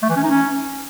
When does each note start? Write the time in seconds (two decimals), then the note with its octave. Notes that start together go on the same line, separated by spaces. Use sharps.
0.02 A3
0.09 E3
0.16 C#4
0.23 D#4
0.30 C#4